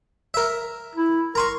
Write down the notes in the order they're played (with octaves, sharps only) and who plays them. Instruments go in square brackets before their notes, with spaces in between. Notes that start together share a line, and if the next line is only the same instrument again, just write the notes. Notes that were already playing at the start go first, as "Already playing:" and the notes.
[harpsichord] A#4 E5
[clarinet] E4
[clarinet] A#4 [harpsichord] A#5 C6 C#6